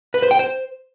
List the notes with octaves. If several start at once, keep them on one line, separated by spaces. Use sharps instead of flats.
B4
C5
G5
C5